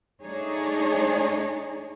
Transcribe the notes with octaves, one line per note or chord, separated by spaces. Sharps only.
A3 D4 D#4 G#4 C#5